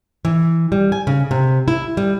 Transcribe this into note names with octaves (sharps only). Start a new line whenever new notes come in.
E3
G3
G#5
C#3
C3
E4
G3